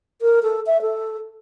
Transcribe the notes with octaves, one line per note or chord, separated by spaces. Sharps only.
A#4
A4
E5
A4